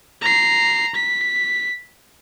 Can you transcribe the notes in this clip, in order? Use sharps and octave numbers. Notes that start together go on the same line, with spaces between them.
A#5 C7
B6